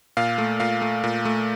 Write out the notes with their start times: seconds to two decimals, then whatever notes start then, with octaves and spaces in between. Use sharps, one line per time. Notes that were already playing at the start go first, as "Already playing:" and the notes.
0.17 A#2 F5
0.38 A3
0.60 A#2 F5
0.82 A3
1.04 A#2
1.25 A3